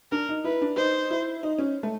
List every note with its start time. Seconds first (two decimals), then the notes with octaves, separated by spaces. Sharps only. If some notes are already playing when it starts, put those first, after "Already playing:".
0.12 D4 A#4
0.29 D#4
0.44 E4 B4
0.62 D4
0.77 D#4 C5
1.11 E4
1.43 D#4
1.58 C#4
1.83 A3